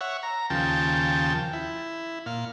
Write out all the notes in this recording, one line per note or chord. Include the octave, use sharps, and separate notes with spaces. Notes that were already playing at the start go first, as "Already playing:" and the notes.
C#5 E5 F#5
A#5
D#2 C#3 F3 G5 A5
E4
A#2 F5